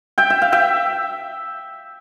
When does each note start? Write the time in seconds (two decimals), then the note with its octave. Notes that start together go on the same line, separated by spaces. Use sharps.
0.18 E5 G5
0.30 E5
0.42 F5
0.52 E5 G5